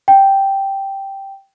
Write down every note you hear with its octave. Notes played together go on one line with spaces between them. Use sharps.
G5